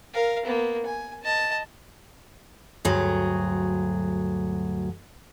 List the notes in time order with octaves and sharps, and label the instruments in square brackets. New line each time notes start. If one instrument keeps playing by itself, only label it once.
[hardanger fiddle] A#4 F5
A#3 B3
G#5
D#5 A5
[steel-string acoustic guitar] D2 G2 F#3 G#4